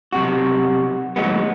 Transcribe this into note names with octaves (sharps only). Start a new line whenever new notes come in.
B1 C3 F#4
D#2 A2 F#3 G#3 B3